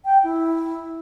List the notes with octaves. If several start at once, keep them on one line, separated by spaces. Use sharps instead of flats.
G5
E4